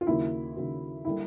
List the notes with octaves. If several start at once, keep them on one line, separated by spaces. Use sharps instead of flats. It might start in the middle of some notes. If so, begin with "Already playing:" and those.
F4
D#2 C#3 F#3 A#3 E4
D#2 C#3 F#3 A#3
D3 G3 A#3 E4